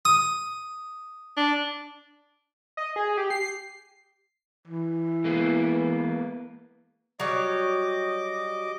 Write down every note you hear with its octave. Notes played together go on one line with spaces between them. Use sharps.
D#6
D4
D#5
G#4
G4
C7
E3
G#3 A#3 B3
F#3 G3 C#5 D#5 D6